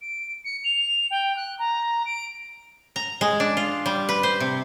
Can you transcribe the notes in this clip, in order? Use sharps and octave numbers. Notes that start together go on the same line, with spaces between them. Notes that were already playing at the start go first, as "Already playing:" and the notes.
D7
C#7
F7
G5
F#6
A#5
D7
A#5
G#3
D4
F4
G3
B4
C5
C3